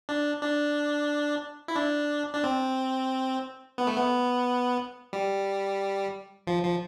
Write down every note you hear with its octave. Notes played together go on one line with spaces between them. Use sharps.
D4
D4
E4
D4
D4
C4
B3
A3
B3
G3
F3
F3